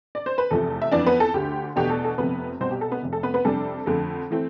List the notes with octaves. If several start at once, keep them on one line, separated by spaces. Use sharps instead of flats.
D5
C5
B4
F1 E2 C3 F3 A3 A4
E5
F2 E3 B3 D4 D5
B3 B4
A4
D2 D3 A3 G4
E2 B2 A3 D4 G4
A4
A4
F1 F2 C3 B3 B4
C2 B2 G3 C4 C5
G4
A4
B3 B4
F1 F2 C3
A4
B3 B4
B3 B4
F2 C3 G3 D4 A4
F2 D3 A3
E3 A3 C4